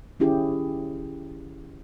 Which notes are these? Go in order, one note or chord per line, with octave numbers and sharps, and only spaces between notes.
D#3 C#4 E4 G4 G#4